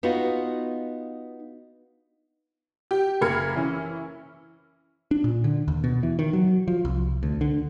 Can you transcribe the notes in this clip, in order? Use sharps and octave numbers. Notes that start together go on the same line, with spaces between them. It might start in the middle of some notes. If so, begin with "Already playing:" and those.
B3 D#4 F4 F#4
G4
F#1 A#3 B5 F6 G#6 C#7
E3 C#4 E4
D4
A#2
D3
D#2
B2
E3
D#3
F#3
F3
C2
D2
D3